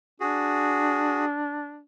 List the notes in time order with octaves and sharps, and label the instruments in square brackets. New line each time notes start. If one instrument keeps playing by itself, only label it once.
[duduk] D4 [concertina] F#4 G#4